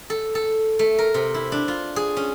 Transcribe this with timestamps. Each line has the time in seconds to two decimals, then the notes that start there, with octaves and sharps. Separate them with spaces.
0.10 A4
0.35 A4
0.79 A3
0.99 A#4
1.14 C3
1.34 E4
1.52 D4
1.68 F4
1.96 G#4
2.17 C#4